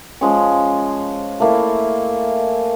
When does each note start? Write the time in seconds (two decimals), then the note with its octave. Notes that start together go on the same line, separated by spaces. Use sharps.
0.21 F3 G#3 C#4
1.40 A3 A#3 E4